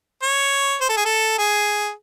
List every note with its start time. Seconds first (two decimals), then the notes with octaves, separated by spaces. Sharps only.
0.23 C#5
0.81 C5
0.89 A4
0.97 G#4
1.05 A4
1.39 G#4